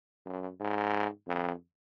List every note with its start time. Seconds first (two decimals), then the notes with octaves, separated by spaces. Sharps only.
0.26 F#2
0.60 G#2
1.28 F2